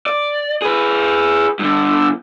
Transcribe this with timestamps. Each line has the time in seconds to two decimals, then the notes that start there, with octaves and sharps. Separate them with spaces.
0.06 D5
0.62 G#4 B4
1.59 G2 D3